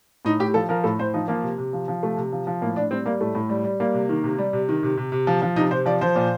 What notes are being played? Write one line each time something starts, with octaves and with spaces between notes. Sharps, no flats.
A2 D#4
A2 G4
F3 A4
F3 A#4
A2 A4
A2 C5
F3 D#4
F3 A#3
C3
C3
F3
F3
C3 A3
C3
F3
F3
A2 A#3
A2 D4
G3 C4
G3 A#3
A2 A3
A2
G3
G3
G3 A#3
C3
D#3
C3
G3
C3
D#3
C3
C3
C3
F3
F3
C3 D#4
C3 C5
F3 D5
F3 C5
A#2